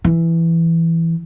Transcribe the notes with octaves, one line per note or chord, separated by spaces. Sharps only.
E3